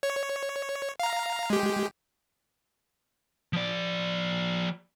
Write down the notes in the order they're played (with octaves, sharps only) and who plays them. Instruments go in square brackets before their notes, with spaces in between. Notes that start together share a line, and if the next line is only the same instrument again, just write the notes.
[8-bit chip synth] C#5
F5 A#5
G#3 G4
[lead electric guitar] F3 D5